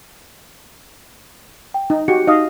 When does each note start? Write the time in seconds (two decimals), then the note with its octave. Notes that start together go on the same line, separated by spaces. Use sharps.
1.74 G5
1.90 D#4
2.08 F#4 G4 C#7
2.27 D#4 D#5 F5 D#6